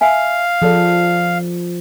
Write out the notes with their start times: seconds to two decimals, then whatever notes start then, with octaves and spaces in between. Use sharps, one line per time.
0.01 E5 F5 G#5
0.62 F3 G#4 A4 D5